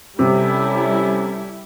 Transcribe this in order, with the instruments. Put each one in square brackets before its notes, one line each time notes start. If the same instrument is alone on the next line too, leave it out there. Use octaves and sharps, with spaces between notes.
[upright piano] C3 [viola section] G3 E4 [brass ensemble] C#4 A4